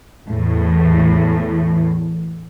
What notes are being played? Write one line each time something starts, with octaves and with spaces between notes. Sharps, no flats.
E2 A2